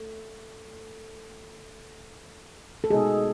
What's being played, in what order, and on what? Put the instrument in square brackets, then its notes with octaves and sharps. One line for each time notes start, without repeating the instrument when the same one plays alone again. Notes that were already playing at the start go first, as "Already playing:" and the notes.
Already playing: [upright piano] A3
[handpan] A4
[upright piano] B2 G#3 D#4 [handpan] G#4